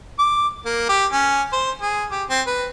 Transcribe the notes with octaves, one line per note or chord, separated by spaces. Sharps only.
D6
A#3
G4
C#4
C5
G#4
G4
C4
B4